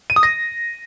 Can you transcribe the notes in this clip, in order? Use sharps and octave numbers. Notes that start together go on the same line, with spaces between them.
D#7
D#6
A#6